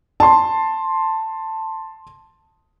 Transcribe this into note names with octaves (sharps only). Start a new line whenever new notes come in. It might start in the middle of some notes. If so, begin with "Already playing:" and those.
A5 C6